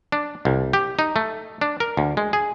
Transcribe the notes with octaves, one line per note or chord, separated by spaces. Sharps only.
D4
C2
G4
D#4
A3
D4
A#4
D2
G#3
G#4